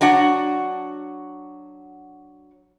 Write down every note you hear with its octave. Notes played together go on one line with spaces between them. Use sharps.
F#3 D4 F#4 F#5